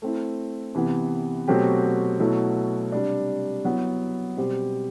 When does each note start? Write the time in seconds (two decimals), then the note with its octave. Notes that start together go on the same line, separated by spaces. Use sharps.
0.02 A3 C4 E4
0.75 C3 E3 B3
1.48 B2 F#3 A3 C4 G4
2.20 B2 F#3 A3 E4
2.92 C3 G3 D4
3.65 F#3 B3 E4
4.37 B2 G3 C4 G4 C5